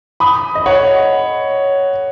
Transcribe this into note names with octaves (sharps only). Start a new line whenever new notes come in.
B5 D#6
D#5
C#5 F#5